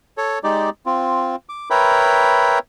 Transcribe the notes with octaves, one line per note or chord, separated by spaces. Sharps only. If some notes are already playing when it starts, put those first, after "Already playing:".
A4 C#5
G#3 D#4 G4 D5
C4 F4
D6
A#4 B4 C#5 E5 G5 B5